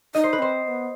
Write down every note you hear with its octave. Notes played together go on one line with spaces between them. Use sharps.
D#4 D#5
C5
B4
C4 C5
C4
B3